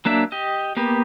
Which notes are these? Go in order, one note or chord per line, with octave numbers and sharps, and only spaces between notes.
F#3 A#3 D4 E5
G4 D#5
A#3 B3 G4